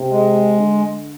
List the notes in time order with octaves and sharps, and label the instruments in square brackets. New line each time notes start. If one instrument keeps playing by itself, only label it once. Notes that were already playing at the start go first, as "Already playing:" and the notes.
Already playing: [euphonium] C3
[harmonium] G#3
[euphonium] D3